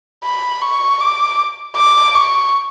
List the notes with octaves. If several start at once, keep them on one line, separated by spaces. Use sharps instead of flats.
B5
C#6
D6
D6
C#6